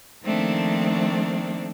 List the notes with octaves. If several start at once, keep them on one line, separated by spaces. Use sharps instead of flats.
D#3 F3 A3 A#3 C4 D4